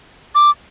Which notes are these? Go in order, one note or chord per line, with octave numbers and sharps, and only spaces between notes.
D6